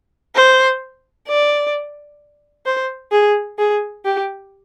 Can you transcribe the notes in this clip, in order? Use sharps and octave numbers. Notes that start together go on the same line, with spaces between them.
C5
D5
C5
G#4
G#4
G4